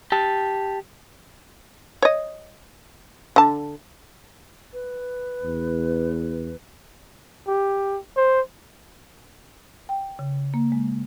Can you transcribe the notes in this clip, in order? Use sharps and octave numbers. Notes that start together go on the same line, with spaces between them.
G4 A5
C#5 D#5
D3 A5
B4
E2
G4
C5
G5
C#3
A#3
G#3